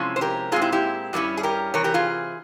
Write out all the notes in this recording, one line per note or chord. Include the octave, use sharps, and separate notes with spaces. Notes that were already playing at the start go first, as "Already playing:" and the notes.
Already playing: C3 F3 G#3 C#4 E4
C5
G4 A#4
A#2 G#3 C4 F4 G#4
E4 G4
E4 G4
G2 G3 A#3 C#4 E4
G#4
G4 A#4
C3 E3 A#4 C#5
G4 A#4
F4 G#4